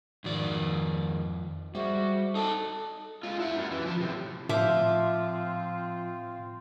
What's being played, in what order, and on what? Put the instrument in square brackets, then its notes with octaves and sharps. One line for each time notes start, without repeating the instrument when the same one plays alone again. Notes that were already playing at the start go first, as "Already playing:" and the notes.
[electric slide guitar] F2 D5 [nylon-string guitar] G#2 D#3 F#4
[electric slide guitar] G3 [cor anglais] F#4 [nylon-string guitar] G#4 C5 E5
[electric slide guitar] D#4 G5 A5 [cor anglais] A4
[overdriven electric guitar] G#3 F4
E4 F#5
F#2 G3
E3
F3 A5
A2 C3
[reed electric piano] A2 [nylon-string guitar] F3 [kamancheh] C4 F4 [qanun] E5 D6